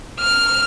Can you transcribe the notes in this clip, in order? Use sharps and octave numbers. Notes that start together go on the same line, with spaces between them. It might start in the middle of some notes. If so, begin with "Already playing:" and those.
F6